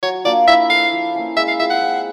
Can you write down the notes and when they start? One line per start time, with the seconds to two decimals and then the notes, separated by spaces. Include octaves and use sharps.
0.02 F#3 C#5
0.25 A#3 D4 F4 D5
0.47 E4 E5
0.70 A4 C5 F5
0.92 F3
1.14 A#3 C#4 E4
1.36 G#3 E5
1.48 F5
1.59 C4 F4 G#4 E5
1.70 F#5
1.81 C4